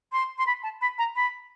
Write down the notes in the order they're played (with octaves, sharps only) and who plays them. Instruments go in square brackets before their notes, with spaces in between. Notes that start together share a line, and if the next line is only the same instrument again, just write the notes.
[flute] C6
C6
B5
A5
B5
A#5
B5